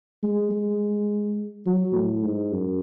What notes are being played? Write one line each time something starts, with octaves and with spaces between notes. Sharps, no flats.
G#3
G#3
F#3
A2
G#2
F#2